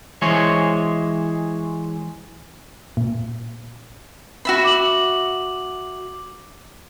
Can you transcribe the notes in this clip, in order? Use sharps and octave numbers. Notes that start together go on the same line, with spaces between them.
E3 G#3 C5 C#5
A#2
F#4 E5 B5
D6 F#7